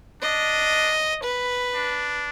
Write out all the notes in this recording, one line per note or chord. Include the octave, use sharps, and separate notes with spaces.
D4 D#5
B4
D4